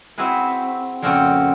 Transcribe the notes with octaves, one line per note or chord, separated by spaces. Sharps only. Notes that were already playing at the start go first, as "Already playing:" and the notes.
C4 E4 F#4 G#4 B4
F2 A#2 C#3 C4 F#4 G4